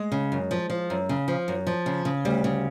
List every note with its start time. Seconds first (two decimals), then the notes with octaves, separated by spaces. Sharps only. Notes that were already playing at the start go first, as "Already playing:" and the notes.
Already playing: G#3
0.12 C#3
0.32 F#2
0.51 F3
0.70 F3
0.90 F#2
1.09 C#3
1.28 F3
1.48 F#2
1.67 F3
1.86 C#3
2.05 C#3
2.25 D2 G3
2.44 C#3